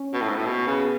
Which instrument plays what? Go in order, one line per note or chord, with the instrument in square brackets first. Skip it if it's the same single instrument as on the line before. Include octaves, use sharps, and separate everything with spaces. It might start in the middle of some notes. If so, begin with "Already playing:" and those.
Already playing: [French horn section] C#4
[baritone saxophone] B2
A2
G#2
A2
[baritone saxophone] B2 [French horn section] B3
[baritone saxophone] C#3